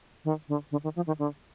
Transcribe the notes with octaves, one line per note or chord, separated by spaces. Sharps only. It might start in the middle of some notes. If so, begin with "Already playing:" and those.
D#3
D3
D3
D#3
F3
D#3
D3